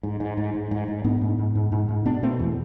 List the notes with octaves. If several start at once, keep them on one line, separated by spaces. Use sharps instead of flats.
G#2
G#2
G#2
G#2
G#2
G#2
G#2 B3 D4
G#2
G#2
G#2
G#2
G#2
B2 B3 D4
B2 A3 C4
E2